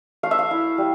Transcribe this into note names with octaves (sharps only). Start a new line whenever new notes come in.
A3 F5
E5
F5
E4
G3